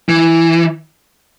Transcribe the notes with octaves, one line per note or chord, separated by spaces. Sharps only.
E3